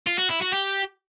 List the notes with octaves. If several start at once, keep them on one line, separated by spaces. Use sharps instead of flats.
F4
F#4
E4
F#4
G4